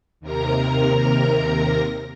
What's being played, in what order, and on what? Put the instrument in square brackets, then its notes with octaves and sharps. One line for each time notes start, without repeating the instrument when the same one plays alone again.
[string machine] D#2 C3 A#4 A#5